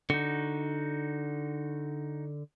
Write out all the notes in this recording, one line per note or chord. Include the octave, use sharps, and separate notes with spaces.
D3 D#4 F#4